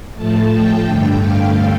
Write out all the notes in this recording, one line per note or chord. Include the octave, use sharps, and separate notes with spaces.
A2 F3 A3 A5
G5
G2 D3 A3
F5